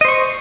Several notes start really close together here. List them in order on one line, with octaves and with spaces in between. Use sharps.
D#5 C5 C#6